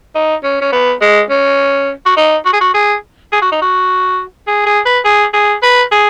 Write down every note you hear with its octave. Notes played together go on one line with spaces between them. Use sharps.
D#4
C#4
C#4
B3
G#3
C#4
F#4
D#4
F#4
G#4
F#4
G#4
G#4
F#4
D#4
F#4
G#4
G#4
B4
G#4
G#4
B4
G#4